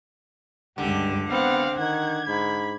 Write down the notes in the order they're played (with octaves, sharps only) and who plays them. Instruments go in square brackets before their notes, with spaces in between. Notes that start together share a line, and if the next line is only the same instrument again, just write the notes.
[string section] C#2 G2 [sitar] D3 [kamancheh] G4
[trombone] B3 [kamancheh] C4 F5 [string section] F#5
[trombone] D#3 [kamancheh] F#5 [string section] G#6
[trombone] G#2 [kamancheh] B5